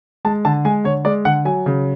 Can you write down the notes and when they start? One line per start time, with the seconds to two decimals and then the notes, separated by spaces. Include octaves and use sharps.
0.25 G#3 A5
0.45 D3 A5
0.65 G#3 G#5
0.84 D3 C#5
1.05 G#3 D5
1.25 D3 F#5
1.45 F#3 G#5
1.66 C#3